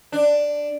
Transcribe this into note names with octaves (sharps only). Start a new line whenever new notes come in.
D4